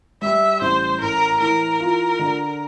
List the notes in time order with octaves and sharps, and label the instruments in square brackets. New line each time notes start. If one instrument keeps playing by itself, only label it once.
[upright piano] G3 [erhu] E5
[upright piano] A1 [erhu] C5
[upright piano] A2 [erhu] A#4
[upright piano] E3 [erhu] A#4
[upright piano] F4
D3